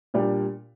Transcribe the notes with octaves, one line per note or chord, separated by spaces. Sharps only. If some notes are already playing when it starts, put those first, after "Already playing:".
A#2 G3 D4